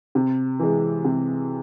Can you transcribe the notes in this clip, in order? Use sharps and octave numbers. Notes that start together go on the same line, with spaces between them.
C3
E3 G#3
C3